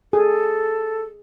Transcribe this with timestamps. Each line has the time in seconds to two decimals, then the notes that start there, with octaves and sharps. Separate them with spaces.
0.13 G#4 A4